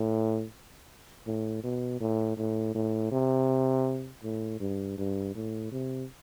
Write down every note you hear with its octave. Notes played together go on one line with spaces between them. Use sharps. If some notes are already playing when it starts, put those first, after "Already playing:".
Already playing: A2
A2
B2
A2
A2
A2
C3
A2
G2
G2
A2
C3